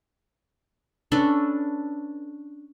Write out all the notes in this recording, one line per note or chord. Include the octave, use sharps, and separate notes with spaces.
C#4 D4 A4 B4